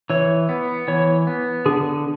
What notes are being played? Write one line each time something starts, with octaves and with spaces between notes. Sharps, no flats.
E3 C#5
B3
E3 C#5
B3
D3 G#4